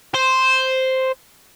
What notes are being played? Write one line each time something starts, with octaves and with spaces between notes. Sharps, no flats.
C5